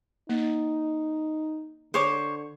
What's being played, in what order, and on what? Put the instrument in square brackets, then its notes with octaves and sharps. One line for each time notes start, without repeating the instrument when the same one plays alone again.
[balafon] A#3 [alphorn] D#4
[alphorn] D3 [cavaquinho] C5 C#5 D6